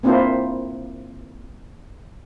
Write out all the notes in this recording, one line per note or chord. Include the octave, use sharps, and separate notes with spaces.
A#3 C4 D4 E4 F4 C5